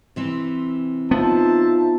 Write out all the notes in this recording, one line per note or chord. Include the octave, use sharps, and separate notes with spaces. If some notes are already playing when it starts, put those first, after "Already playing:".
C3 E3 C4
B3 D#4 F4 C5 E5 A5